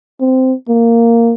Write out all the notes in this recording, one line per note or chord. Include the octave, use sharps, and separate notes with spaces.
C4
A#3